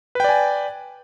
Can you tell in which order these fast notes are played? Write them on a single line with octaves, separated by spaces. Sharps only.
B4 G5 D5 G#5